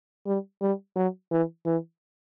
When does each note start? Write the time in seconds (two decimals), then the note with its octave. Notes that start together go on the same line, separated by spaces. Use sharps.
0.26 G3
0.61 G3
0.96 F#3
1.31 E3
1.66 E3